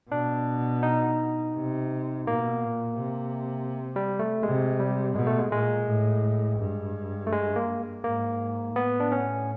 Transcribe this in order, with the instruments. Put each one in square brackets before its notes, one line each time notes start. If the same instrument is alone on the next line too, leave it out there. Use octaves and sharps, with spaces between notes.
[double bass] B2 [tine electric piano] D4
[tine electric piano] D#4
[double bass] C3
[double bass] B2 [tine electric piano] A#3
[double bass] A#2
C3
[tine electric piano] G3
A3
[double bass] C3 [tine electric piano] G#3
[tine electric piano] G3
[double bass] B2 [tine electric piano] G#3
[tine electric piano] A3
G#3
[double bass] A#2 [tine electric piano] G#3
[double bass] A2
G2
[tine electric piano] A3
G#3
A#3
[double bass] G#2 [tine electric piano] A#3
[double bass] A2 [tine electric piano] B3
[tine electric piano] D4
C#4